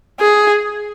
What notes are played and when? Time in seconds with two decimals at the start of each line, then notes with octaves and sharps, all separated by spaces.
0.20 G#4